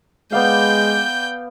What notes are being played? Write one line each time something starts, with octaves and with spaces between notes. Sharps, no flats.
G#3 B3 D5 F5 G5 G6